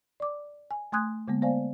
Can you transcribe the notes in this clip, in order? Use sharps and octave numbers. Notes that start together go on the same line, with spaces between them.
D5 D6
G#5
A3 G#5 C6 D#6 F#6 G#6
D3 G#3 A#3 B3
B3 C5 D5 F5 G#5